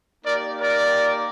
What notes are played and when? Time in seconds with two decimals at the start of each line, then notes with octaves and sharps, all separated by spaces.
0.25 A#3 D#4 G4 A#4 D5
0.60 A#4 D5